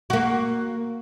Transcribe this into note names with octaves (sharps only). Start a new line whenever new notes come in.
A#3 F#4